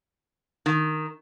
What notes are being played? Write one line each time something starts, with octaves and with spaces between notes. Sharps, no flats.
D#3